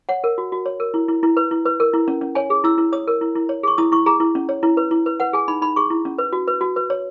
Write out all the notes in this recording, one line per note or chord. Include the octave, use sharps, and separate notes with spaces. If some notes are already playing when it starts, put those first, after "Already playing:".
C#5 F#5
A#4
F#4
F#4
C#5
A#4
E4
E4
E4
B4
E4
B4
A#4
E4
C#4
C#4
C#5 G#5
G#4
E4 E6
E4
C#5 D#6
A#4
E4
E4
C#5
G#4 C#6
E4 D#6
E4 C#6
G#4 A#5
E4
C#4
C#5
E4
B4
E4
B4
B4 F#5
G#4 G#5
D#4 B5
D#4 B5
G#4 C#6
E4
C#4
B4
F#4
B4
F#4
B4
C#5